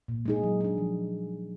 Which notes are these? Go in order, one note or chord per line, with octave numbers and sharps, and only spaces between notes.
A#2
G#3 D#4 G#4
F#3
D4 G#4
F3